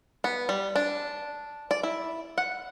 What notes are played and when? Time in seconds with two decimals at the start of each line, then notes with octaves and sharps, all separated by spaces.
0.24 B3
0.49 G3
0.76 D4
1.71 D5
1.83 E4
2.38 F#5